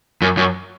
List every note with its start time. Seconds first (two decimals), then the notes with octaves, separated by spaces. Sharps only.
0.22 F#2
0.37 F#2